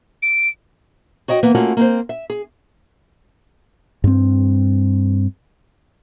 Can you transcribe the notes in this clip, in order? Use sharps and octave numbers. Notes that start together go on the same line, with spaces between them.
D7
F#4 C#5 D#5 G5
E3 A#3 B3 B4
A3 A#3 C#4 F4 F#4
A#3 C4 C5
E5
G#4
G2 C4